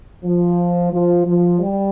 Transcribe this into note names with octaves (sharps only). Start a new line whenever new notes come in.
F3
F3
F3
G3